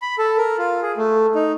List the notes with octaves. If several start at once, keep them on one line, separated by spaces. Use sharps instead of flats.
B5
A4
A#4
F4
G#4
A3
D#4